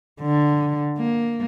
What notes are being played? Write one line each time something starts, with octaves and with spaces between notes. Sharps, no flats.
D3
A#3